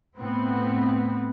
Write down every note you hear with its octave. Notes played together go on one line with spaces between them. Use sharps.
A2 B3 C4